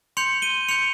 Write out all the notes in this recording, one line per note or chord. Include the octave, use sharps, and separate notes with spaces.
C6 G6 C#7 F7
D#7 G7
C6 G6 C#7 F7